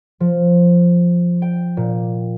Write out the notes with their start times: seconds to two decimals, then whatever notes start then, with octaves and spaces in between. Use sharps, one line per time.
0.20 F3
1.42 G5
1.77 A#2